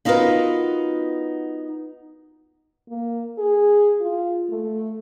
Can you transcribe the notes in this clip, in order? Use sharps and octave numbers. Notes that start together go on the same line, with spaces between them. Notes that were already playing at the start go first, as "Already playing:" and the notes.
B3 D#4 F4 F#4 A#4 B4
A#3
G#4
F4
A3